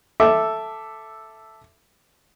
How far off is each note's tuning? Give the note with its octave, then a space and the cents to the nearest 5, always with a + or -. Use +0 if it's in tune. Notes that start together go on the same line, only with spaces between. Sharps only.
A4 +0 E5 +5 D6 +0